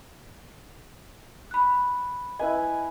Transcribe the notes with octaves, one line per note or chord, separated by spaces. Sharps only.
B5 F#6
E4 B4 D#5 G#5